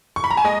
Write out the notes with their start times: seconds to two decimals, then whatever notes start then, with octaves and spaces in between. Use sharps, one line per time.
0.16 C#6
0.24 B5
0.31 A#5
0.37 G#5
0.44 G#3 D#5